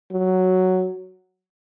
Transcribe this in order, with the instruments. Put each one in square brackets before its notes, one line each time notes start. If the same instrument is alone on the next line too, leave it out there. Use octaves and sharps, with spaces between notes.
[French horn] F#3